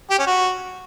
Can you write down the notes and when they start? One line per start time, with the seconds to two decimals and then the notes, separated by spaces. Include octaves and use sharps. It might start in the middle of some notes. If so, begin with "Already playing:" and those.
0.10 G4
0.19 C#4
0.27 F#4